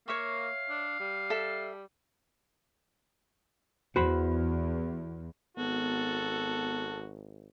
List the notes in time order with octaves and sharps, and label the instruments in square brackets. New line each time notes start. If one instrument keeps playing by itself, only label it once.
[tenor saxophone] A#3 [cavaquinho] C#5 E5 C#6 [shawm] F5
[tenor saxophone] D4
G3
[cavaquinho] A4 E5
[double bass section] E2 [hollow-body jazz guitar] F#4 C5 B5
[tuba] G#1 [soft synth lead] B3 [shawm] F#4 [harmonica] A4